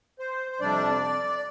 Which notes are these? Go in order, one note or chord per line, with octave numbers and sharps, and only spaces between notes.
C5
C5
F2 C3 G3 D4 D5